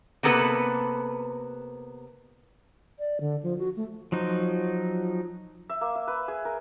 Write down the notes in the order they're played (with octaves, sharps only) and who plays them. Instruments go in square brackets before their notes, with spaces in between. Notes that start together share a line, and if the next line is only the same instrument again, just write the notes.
[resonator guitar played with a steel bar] C3 A#3 B3 A4 B4
[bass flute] D5
D3
F3
F#4
A3
[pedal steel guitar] F3 F#3 D#4
[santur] E5
A#3
E5
B4
G#4
A#4